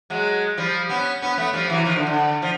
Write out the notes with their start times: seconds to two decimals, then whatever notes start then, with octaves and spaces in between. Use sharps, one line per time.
0.10 F#3 G#3
0.57 F3 G3
0.89 B3 C#4
1.22 B3 C#4
1.38 A3 B3
1.53 F3 G3
1.70 E3 F#3
1.85 D#3 F3
1.96 D3
2.07 D3
2.42 F3